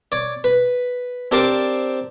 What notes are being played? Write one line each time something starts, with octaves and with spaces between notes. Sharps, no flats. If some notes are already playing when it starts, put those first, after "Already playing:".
C#5 D5
B4
C4 D4 G4 A#4 C5 D5